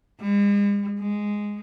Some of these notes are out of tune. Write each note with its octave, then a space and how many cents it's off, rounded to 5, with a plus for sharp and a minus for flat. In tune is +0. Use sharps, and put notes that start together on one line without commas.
G#3 -45
G#3 -5